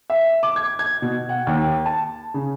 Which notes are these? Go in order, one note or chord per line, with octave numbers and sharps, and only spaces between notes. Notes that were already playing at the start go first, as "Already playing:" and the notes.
E5
D6
G#6
G#6
B2
F#5
D#2
A5
C#3